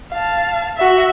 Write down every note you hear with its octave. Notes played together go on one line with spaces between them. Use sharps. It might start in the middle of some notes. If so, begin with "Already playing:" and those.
F5 A5
F#4 E5